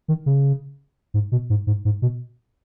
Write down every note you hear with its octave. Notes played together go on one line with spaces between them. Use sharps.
D#3
C#3
G#2
B2
G#2
G#2
G#2
B2